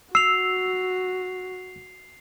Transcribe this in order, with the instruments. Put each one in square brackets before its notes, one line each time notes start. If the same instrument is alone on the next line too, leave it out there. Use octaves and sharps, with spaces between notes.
[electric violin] F#4 [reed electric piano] E6 [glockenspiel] C7 F7